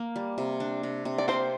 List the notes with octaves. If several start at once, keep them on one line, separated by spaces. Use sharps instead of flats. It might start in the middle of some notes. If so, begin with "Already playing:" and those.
Already playing: A#3
G3
C3
D4
C3
C3
D5
A#3 C4 C5